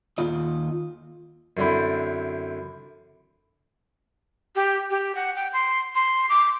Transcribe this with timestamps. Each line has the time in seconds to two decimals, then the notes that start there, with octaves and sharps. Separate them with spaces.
0.18 D#2 F4 D#5
1.57 F#2 D3 C4 D4 E4
4.56 G4
4.90 G4
5.15 F#5
5.36 G5
5.53 C6
5.95 C6
6.29 D6